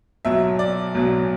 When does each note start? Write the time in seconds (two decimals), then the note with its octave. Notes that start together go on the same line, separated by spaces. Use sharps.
0.25 B1 B2 F#3 E5
0.59 D5
0.95 B1 B2 F#3